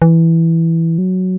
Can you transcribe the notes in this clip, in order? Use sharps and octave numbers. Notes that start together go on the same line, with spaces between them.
E3
F#3